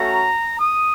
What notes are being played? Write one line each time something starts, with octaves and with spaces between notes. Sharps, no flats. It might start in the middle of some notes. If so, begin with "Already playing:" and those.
Already playing: A3 C#4 F#4 A#5
D#6